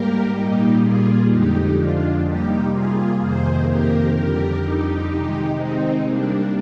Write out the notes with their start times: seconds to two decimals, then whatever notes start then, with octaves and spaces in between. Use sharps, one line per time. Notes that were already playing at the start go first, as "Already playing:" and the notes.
Already playing: G#2 G3 A#3 G4 A#4
0.32 A#2 G3 A#3 D#4 G4
0.80 F4 G#4
1.27 F2 D3 G#3 D#4 G4
1.76 D4 F4
2.24 C3 G3 A#3 D#4 G4
2.70 F4 G#4
3.18 F2 C3 D#3 A#3 G#4 C5
3.66 G4 A#4
4.14 F2 D3 G3 G4 A#4
4.62 D#4 G4
5.10 C3 D#3 G#3
5.57 C4 D#4
6.05 C3 G3 A#3 D4